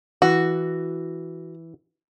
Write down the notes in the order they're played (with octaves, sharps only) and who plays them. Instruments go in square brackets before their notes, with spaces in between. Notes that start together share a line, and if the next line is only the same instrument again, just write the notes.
[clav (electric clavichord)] E3 [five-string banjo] F#4